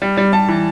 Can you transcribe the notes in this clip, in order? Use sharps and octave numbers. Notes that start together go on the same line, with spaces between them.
G3
G3
G3 A5
E3